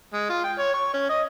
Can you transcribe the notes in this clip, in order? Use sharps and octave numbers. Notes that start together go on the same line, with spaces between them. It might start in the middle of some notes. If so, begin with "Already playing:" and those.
G#3
F4
G5
C#5
C#6
C#4
D#5